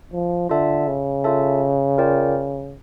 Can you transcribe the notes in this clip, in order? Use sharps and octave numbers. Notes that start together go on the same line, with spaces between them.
F3
D3 F4 A4 E5 A5
C#3
F4 A4 E5 A5
F4 A#4 D5 G5